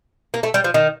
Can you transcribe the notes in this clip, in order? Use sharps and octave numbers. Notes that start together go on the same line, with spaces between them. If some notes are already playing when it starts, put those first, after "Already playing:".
A#3
A3
G3
F3
D#3